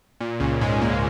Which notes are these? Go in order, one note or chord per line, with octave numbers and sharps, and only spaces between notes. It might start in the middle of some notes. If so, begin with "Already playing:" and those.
A#2
C#2 C#3
G#2 G#3
A#2 A#3